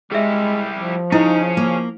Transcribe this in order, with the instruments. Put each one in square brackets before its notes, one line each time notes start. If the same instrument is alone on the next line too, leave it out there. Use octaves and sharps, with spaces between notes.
[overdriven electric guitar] G3 E4 [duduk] G#3 [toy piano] G#4 E5
[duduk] F3
[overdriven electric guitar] C#4 G#4 [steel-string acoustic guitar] D#4 [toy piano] E4 C5
[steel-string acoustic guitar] A#3